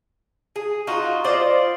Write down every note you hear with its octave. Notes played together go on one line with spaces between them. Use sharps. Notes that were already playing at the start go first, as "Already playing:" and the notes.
G#4
D#4 F4 F#4
F4 C5 D5 D#5